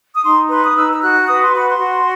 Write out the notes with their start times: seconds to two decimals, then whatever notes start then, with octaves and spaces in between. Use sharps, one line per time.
0.15 D#6
0.24 D#4 C6
0.50 B4 C6
0.63 D#6
0.75 D#4 E6
0.92 E6
1.01 F#4 F#6
1.27 B4 D#6
1.42 C6
1.53 F#4 B5
1.69 C6
1.79 F#4